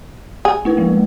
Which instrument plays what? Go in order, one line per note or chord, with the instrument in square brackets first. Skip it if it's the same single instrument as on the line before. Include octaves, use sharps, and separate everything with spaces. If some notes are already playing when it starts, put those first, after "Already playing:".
[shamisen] G#4
[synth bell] A3 E4 B4
F3 G#3 A#3